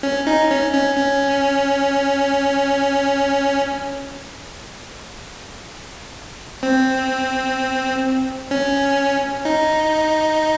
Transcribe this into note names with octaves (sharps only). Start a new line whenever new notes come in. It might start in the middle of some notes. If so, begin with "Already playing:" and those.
C#4
D#4
C#4
C#4
C#4
C4
C#4
D#4